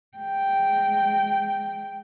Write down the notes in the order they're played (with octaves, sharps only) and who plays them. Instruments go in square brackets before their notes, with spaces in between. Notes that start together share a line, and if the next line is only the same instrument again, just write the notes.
[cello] G#3 G5